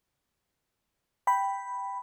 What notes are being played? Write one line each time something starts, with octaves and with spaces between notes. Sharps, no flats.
G5 B5